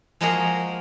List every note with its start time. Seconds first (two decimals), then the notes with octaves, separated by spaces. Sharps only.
0.21 F3 G#3 A#3 F#4 G#4 A#4